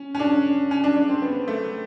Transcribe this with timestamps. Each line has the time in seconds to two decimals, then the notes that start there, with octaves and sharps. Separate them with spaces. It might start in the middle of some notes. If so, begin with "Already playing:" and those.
Already playing: C#4
0.15 C#4
0.20 D4
0.71 C#4
0.84 D4
0.96 D4
1.09 C4
1.22 B3
1.48 A3